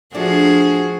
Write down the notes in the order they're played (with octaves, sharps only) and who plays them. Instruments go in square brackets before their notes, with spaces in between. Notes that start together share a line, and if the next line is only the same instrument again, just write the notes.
[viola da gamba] F3 F#4 G#4 [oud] A3 D4